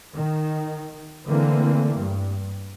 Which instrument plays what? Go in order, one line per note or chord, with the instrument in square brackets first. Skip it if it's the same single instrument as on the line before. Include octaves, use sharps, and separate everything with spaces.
[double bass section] D#3
D3 E3 A3 A#3 C4
G2